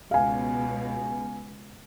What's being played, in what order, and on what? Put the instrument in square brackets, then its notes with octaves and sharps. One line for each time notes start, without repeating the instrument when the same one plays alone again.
[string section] C#2 B2 [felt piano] F5 G#5